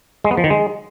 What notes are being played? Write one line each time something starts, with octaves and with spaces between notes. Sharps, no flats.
G#3
B3
F3
D#3
G#3